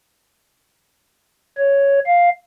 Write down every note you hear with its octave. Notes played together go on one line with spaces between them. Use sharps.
C#5
F5